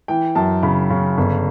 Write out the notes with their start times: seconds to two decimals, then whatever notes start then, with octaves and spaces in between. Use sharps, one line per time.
0.08 E3 G5
0.35 F#2 A5
0.63 C#3 B5
0.90 C#3
1.17 G1